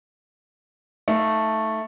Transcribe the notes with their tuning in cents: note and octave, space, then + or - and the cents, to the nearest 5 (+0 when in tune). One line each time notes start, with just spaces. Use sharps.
A3 +0 D#4 +25 F5 +0